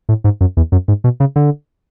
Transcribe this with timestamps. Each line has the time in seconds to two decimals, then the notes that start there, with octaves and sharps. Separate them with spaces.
0.09 A2
0.24 G#2
0.41 F#2
0.57 E2
0.72 F#2
0.88 G#2
1.04 B2
1.20 C#3
1.36 D3